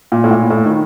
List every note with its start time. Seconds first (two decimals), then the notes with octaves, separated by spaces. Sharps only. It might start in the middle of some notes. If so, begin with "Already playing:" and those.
0.12 A#2
0.24 A2
0.31 A#2
0.50 A2
0.65 D#3